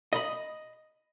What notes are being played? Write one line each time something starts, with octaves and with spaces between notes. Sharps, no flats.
D#5 A#5 B5